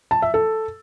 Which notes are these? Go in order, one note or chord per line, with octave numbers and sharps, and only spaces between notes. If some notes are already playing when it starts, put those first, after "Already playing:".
A5
E5
A4